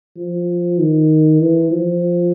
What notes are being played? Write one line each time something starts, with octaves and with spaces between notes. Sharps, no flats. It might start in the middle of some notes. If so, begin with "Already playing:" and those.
F3
D#3
E3
F3